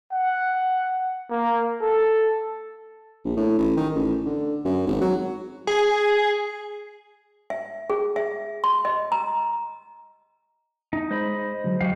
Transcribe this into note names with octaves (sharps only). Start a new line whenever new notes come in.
F#5
A#3
A4
A#1
A2
A1
D#3
A1
D3
F#2
G#1
F#3
G#4
E5
G#4
E5
C6
D#5
A#5
D#4
G#3 C5 D#5 B5
D3 F#3 G#3
D#2 F#3 F#4 G4 F5